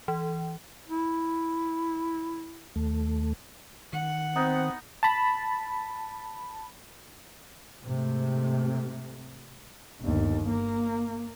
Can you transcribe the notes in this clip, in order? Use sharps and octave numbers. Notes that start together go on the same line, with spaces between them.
E3
E4
D#2 A3
D#3 F#5
B3 C4 D#4
A5 B5
G#2 C3 A3
G1 D#2
A#3